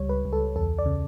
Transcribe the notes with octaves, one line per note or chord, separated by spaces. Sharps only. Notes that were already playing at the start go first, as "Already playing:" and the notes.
Already playing: C#2 G3 C#5
B4
C#2
A4
E2 A4
D5
C#3